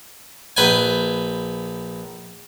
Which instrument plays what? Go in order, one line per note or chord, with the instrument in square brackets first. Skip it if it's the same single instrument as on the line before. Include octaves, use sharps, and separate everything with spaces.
[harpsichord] A#1 B4 G5 G#5